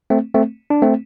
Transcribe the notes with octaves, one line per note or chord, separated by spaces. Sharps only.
A3 C4
A3 C4
D4
A3 C4